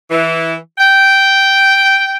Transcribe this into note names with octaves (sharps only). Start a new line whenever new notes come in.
E3
G5